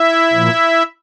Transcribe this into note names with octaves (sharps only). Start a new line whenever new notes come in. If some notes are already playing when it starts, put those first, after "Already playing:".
Already playing: E4 E5
A#2 F3 A#3